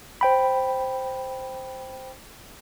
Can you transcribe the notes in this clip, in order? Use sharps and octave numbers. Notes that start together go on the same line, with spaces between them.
C5 G5 B5